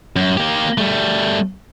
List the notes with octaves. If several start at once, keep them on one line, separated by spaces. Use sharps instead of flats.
F#2
A#3 G4
G3 A3